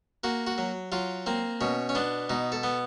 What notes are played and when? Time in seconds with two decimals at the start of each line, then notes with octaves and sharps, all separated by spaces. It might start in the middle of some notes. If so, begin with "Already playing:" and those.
0.24 A#3 F#4
0.47 F#4
0.58 F#3
0.92 F#3 F4
1.26 A#3 C4
1.61 B2 C#4
1.89 C#4
1.95 B3 D4
2.30 B2 D#4
2.52 A4
2.63 B3